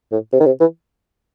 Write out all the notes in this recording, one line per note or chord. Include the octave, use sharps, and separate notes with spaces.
A2
C3
D#3
C3
E3